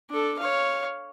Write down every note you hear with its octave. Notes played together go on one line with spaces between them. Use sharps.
D4 A4
C#5 F5